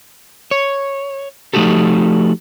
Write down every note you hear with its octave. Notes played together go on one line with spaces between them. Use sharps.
C#5
F3 A3 D#4 F#4 G4 A4